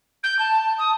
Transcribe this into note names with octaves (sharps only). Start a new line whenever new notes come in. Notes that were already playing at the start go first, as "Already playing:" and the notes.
G6
A5
D#6